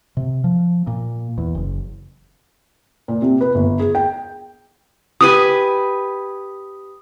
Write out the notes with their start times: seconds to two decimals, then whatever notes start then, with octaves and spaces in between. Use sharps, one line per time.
0.17 C3
0.44 F3
0.87 A#2
1.38 E2
1.55 F#1
3.08 A#2
3.22 C3
3.41 B4
3.55 G1
3.79 G#4
3.95 G5
5.21 G4 B4 G#5 D#6